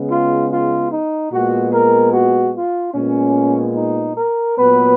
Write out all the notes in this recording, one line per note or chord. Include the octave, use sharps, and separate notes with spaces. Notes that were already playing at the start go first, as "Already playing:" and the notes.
Already playing: C#3 G#3 B3
F4
F4
D#4
A#2 G#3 B3 F#4
A#4
F#4
F4
A#2 G#3 B3 C#4
D#4
A#4
A#2 F#3 B3 B4